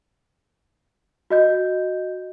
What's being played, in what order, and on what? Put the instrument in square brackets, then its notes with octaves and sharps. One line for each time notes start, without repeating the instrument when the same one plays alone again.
[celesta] F#4 D#5 G6